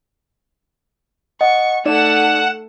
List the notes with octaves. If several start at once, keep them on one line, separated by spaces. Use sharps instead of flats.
D#5 F#5 C#6
A3 D#4 D5 F#5 E7